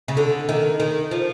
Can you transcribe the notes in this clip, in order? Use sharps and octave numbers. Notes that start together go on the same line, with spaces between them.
C#3
D3
D#3
D#3
F3